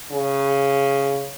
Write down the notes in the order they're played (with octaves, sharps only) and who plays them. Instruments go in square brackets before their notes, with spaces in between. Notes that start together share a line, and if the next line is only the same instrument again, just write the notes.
[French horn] C#3